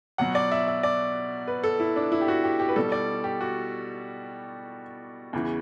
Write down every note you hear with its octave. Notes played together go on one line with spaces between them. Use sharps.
B2 F#3 F#5
D5
E5
E5
D5
B4
A4
E4
D4
E4
G4
F#4
G4
G4
B4
B2 G3 A4
D5
G4
F#4
E2 C#3 E3